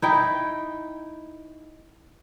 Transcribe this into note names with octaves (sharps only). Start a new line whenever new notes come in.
D#4 E4 G5